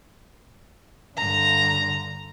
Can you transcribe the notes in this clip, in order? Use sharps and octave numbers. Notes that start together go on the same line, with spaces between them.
G2 D3 A#5